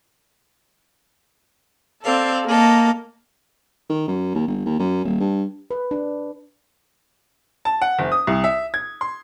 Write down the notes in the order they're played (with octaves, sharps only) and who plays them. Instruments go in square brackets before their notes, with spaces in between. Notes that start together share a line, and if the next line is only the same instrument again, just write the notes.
[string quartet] C4 D5 F5 [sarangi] A4
[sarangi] A#3 [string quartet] A4 D#5
[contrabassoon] D#3
F#2
D#2
G1
D#2
F#2
D#1
G2
[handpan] B4
D4
[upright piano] A5
F#5
F#1
D#6
C2
E5
G#6
C6